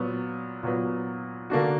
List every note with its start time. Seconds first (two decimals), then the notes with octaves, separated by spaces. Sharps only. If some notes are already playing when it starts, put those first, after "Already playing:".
Already playing: A#2 F#3 B3
0.63 A#2 F#3 B3
1.50 D3 A#3 D4 F#4